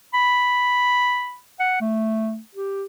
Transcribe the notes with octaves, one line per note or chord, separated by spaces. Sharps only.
B5
F#5
A3
G4